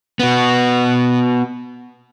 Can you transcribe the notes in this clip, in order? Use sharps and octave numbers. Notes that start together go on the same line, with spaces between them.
B3 F#4